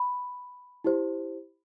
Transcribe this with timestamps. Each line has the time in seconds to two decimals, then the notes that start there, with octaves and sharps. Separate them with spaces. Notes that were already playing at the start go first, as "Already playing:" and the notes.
Already playing: B5
0.84 E4 G4 C5